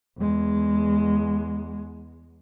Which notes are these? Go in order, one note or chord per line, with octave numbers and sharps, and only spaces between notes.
E2 G#3